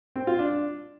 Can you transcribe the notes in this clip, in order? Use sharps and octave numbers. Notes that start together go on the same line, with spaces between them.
C4
F4
D4